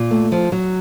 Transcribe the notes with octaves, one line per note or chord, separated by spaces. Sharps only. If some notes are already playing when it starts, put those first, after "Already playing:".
Already playing: A#2
A3
F3
F#3